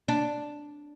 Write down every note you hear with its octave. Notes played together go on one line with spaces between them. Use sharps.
D4